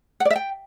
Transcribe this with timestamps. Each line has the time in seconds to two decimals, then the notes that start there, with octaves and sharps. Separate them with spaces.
0.20 F#5
0.25 D5
0.30 E5
0.36 G5